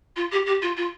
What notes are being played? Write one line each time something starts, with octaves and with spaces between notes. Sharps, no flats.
F4
G4
G4
F4
F4